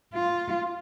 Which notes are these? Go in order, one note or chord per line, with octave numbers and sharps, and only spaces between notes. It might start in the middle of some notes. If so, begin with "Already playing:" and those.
F4